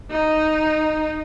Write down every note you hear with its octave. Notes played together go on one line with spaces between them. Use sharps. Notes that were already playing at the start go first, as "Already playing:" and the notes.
D#4